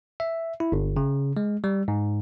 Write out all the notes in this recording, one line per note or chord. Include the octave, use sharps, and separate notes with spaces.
E5
E4
G1
C#3
G#3
G3
G#2